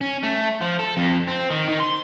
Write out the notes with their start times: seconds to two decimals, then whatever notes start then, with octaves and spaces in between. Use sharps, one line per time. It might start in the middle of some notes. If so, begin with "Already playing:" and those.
0.01 C#4
0.23 A3
0.61 F3
0.79 A4
0.97 F2
1.27 C4
1.50 D#3
1.68 D#3
1.80 C6